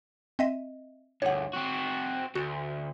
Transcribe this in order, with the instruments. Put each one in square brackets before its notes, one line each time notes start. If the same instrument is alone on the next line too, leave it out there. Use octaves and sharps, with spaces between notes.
[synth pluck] C4 D#5 E5
[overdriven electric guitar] D2 G2 [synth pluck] C#5 F#5
[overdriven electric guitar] C4 F#4
[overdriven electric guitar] D2 [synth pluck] F#4